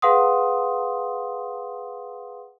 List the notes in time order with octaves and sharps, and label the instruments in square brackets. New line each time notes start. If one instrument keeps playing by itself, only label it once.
[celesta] G#4 B4 F5 F#5 C6 D#6